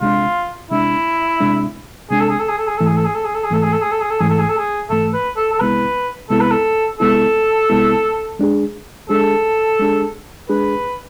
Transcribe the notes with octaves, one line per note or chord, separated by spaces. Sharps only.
C3 G#3 D4 F4
C3 G#3 D4 E4
C3 G#3 D4
C3 G#3 D4 G#4
A4
G#4
A4
G#4
A4
G#4
G#2 E3 A3 A4
G#4
A4
G#4
A4
G#4
A4
G#4
G#2 E3 A3 A4
G#4
A4
G#4
A4
G#4
A4
G#2 E3 A3 G#4
A4
G#4
A4
G#4
G#2 E3 A3 A4
B4
A4
A4
C2 C3 G#3 B3 E4 B4
C2 C3 G#3 B3 E4 A4
B4
A4
C2 C3 G#3 B3 E4 A4
C2 C3 G#3 B3 E4
G#3 D4 G#4
G#3 D4 G#4 A4
G#3 D4 G#4
G#3 D4 G#4 B4